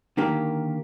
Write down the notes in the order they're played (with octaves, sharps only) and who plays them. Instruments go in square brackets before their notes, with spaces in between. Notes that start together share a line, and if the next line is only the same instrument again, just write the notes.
[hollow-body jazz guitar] D3 D#3 A#3 G4